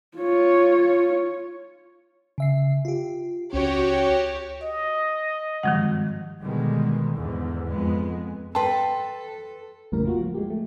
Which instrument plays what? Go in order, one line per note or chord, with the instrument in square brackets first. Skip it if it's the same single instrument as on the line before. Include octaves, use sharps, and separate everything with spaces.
[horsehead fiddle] F4 C#5
[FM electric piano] C#3 E5 C7
F4 G4
[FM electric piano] C#2 C#4 [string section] F#4 G4 C#5
[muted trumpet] D#5
[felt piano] G#1 G2 [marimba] D#3 F3 F#5
[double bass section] B2 D3 D#3 G3 G#3
E2 G#2 D3
F2 G#3 B3
[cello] A4 [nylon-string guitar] B4 G5 [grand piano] A5 C6
[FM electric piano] A1 F2 A2 C#3 G3 A#4
A#3 F4 F#4
F3
G#3 G4
A3